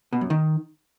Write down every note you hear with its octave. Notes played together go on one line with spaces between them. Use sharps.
B2
F#2
D#3